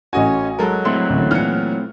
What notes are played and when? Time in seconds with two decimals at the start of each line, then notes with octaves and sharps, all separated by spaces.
0.13 A1 A3 C#4 F#4 D#5 G#5
0.59 F#3 G#3 A4 A#4
0.85 A3 C4 E4 C6
1.10 A1 D2
1.31 A#2 E3 F6 C#7